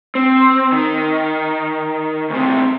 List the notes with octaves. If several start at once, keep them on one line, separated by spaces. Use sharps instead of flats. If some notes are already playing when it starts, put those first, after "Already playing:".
C4
D#3
D2 C3